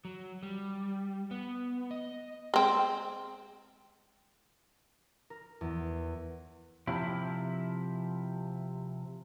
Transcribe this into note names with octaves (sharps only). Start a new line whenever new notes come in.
F#3
G3
B3
D#5
G#3 C4
A#4
E2
C3 F3 E4